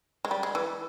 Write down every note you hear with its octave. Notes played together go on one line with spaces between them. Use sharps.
G#3
G3
G#3
E3